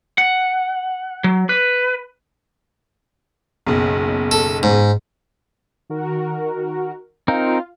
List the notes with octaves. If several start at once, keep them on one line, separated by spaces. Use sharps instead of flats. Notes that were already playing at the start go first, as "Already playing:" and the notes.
F#5
F#3
B4
F#1 B1
A4
G#2
D#3 F#4 A#4
C4 D#4 F4 A#4 F5